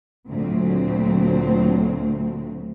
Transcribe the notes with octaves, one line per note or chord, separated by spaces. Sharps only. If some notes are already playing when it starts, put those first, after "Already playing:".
D2 A#2 F#3 C4